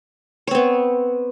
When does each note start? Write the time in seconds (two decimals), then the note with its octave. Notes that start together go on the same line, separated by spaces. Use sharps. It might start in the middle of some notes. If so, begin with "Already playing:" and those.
0.47 C#5
0.51 C4
0.55 B3